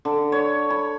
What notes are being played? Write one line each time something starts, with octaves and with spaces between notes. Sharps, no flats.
D3
C#5
B5